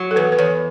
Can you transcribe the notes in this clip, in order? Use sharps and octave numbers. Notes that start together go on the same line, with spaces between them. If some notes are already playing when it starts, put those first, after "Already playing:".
Already playing: F#3
A4
E2 B4
B4
E2 C#5